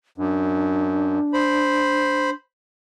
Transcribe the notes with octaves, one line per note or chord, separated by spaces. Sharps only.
F#2 D4
C5 B5